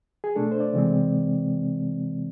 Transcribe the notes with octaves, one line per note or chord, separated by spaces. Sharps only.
G#4
B2 A3 D4 A4
C5
D5
C3 E3 G#3 C4